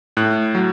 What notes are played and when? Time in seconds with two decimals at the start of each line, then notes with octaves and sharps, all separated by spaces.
0.17 A2 F#6
0.55 F#3